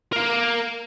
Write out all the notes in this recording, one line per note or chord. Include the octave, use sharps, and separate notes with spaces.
A#4 F5